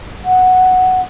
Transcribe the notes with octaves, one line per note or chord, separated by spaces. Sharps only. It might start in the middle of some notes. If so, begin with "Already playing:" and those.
F#5